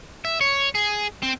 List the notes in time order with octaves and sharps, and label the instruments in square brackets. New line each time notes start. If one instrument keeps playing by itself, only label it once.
[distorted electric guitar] E5
C#5
G#4
C4